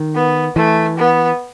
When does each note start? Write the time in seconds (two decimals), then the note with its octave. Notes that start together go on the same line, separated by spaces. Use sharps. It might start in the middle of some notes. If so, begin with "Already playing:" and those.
Already playing: D#3
0.15 B3
0.56 E3 A3
0.98 B3